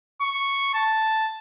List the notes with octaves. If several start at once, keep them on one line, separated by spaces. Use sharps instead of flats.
C#6
A5